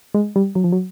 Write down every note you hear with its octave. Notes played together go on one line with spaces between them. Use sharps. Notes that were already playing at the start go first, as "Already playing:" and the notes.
G#3
G3
F#3
F3
F#3